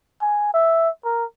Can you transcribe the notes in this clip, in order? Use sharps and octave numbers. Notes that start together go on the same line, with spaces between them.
G#5
E5
A#4